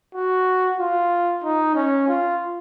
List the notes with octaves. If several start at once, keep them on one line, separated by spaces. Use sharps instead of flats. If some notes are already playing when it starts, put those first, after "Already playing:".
F#4
F4
D#4
C#4
F4